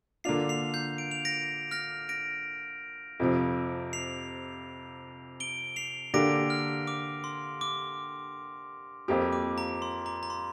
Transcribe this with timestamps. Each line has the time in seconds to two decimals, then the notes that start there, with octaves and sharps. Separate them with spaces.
0.24 D3 A#3 D4 F4 C7 F7
0.49 C7 F7
0.74 G6 C7
0.98 D7
1.11 F7
1.25 A#6 D7
1.71 F6 A#6
2.09 A#6 D7
3.20 F2 C3 F3
3.93 C7 F7
5.40 D7 G7
5.76 C7 F7
6.14 D3 A#3 D4 G4 A#6 D7
6.50 F6
6.87 D6
7.24 C6
7.61 D6
9.08 F2 F3 A#3 G4
9.32 D6
9.58 A#5
9.82 C6
10.06 A#5
10.23 A#5
10.30 C6